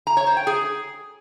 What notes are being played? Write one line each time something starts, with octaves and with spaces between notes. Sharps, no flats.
A#5
C#5
C5
G5
G#4